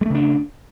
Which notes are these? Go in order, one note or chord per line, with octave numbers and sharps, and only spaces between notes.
C#3 G#3 A3 D4